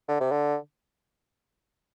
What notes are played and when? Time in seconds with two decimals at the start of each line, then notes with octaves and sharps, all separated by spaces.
0.08 D3
0.20 C3
0.32 D3